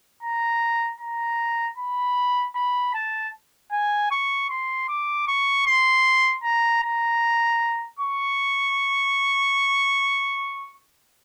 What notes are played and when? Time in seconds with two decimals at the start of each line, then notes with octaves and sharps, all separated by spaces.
0.23 A#5
1.00 A#5
1.78 B5
2.55 B5
2.94 A5
3.72 G#5
4.11 C#6
4.50 C6
4.89 D6
5.27 C#6
5.66 C6
6.44 A#5
6.83 A#5
7.99 C#6